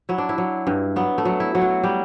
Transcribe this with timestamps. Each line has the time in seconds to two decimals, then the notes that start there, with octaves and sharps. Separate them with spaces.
0.09 F#3 E4
0.18 D4
0.29 E4
0.38 F#3
0.67 G2
0.96 F#3 B3
1.18 A3
1.25 F#3
1.40 E4
1.55 F#3
1.61 F#4
1.83 G3